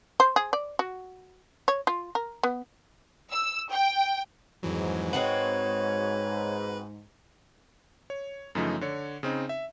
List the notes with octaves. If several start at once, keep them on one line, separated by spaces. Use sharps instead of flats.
C5
G#4
D5
F#4
C#5
F4
A#4
B3
E6
G5
F2 G#2 E3 F#3
G#3 C4 F#4 B4 C#5
C#5
F#2 C#3 E3 F3 A3 D#4
D3 C#5 C#7
C#3 C4 D#4
E5